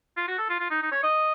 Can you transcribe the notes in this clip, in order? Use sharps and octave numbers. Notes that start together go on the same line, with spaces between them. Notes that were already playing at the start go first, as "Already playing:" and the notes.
F4
F#4
A4
F4
F4
D#4
D#4
C#5
D#5